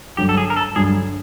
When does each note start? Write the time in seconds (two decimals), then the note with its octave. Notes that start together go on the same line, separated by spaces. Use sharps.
0.17 G2 D3 F#3 G4
0.29 A4
0.37 G#4
0.50 A#4
0.56 A4
0.76 G2 D3 F#3 G#4